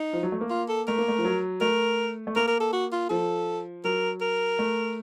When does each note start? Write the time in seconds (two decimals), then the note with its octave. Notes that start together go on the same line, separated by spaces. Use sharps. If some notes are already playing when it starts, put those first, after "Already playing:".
Already playing: D#4
0.13 F3
0.23 F#3
0.32 A3
0.41 A#3
0.50 F4
0.69 A4
0.88 A3 A#4
0.98 A#3
1.08 A3
1.18 F3
1.25 F#3
1.61 A3 A#4
2.27 A3
2.36 A#3 A#4
2.48 A#4
2.60 A4
2.73 F#4
2.92 F4
3.10 F3 A4
3.84 F#3 A#4
4.21 A#4
4.59 A3